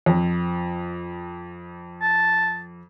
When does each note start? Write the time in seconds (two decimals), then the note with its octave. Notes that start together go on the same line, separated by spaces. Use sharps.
0.06 F2
2.02 A5